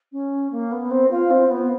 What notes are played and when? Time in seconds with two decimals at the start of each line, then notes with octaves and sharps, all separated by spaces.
0.12 C#4
0.51 A#3
0.71 B3
0.90 C4
1.10 F4
1.30 C4
1.50 B3